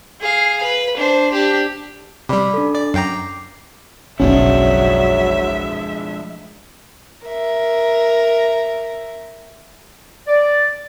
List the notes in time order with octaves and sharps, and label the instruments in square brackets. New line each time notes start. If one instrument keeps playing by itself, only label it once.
[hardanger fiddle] G#4 F5
B4
D4 C5
D4 G4
[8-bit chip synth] C3 G3 [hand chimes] D5 B5 D6
[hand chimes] D4 A4
[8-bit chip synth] D5
[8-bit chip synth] F#2 G5 A#5 [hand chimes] D6 C7
[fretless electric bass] F#1 B1 C#4 [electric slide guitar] F3 G#3 D4 [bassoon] F#3 [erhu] E5
[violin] A#4 E5
[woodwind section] D5